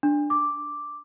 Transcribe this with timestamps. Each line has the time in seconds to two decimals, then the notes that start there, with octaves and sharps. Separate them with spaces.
0.03 D4
0.30 D6